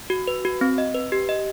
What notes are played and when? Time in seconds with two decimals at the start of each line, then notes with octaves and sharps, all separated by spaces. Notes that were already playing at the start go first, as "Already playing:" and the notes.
0.10 F#4
0.27 B4
0.45 F#4
0.61 C4
0.78 D#5
0.94 B4
1.12 G4
1.29 D#5